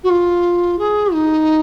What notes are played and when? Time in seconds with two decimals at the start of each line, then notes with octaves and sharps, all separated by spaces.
0.04 F#4
0.10 F4
0.79 G#4
1.13 D#4